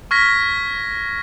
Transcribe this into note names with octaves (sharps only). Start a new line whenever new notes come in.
C#6 F6 G#6 A#6 B6